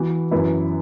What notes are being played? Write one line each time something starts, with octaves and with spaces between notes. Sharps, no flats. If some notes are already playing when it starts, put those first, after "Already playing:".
Already playing: E3 B3 F#4
F#2 E3 B3 E4